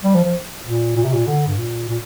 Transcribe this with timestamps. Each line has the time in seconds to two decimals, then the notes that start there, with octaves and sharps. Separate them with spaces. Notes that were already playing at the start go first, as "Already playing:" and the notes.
0.04 G3
0.14 F3
0.25 F3
0.66 A#2
0.97 A#2
1.04 C3
1.14 A#2
1.27 D3
1.47 G2
1.58 A#2
1.89 A#2